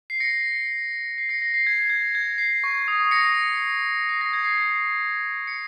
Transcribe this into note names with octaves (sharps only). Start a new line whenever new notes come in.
C7
A#6 C#7
C7
A#6 C#7
A#6 C#7
C7
G#6
G#6
G#6
C7
C#6
D#6
A#6 C#7
C7
A#6
G#6
C7
C#7